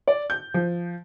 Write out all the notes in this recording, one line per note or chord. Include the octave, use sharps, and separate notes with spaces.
D5
G6
F3